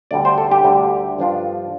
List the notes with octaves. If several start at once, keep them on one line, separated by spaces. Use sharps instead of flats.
D2 D3 G3 D5
C5
A4
G4
D2 D3 G3
G2 F3 D4 F4